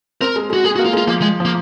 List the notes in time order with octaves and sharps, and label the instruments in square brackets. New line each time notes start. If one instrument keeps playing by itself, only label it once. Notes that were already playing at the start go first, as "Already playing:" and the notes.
[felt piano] C4 [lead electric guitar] A#4
[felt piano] G#3
G#3
[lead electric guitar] F#4
[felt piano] G#3 [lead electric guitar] G#4
[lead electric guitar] F#4
[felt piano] A#3
[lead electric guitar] F4
[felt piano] G#3
[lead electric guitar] F4
[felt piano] F3 [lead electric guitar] A#3
[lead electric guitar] G#3
[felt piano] F3
[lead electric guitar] A#3